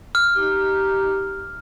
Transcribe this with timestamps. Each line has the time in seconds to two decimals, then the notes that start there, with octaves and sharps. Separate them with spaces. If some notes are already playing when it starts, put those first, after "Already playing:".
0.15 F6
0.36 D#4 G4